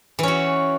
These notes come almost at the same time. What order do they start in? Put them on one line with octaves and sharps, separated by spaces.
E3 C#4 F#4